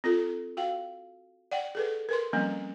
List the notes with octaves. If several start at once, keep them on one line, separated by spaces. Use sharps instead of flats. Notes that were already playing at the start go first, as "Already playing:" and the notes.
C4 F4 A4
F#4 F5 G5
D5 F#5 G5
G#4 A4 B4
A#4 B4 C6
F3 G3 A#3 C4 C#4